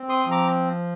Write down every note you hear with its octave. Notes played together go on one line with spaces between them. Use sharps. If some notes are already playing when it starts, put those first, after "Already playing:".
Already playing: C4
C6 D#6
F3
A#5 D6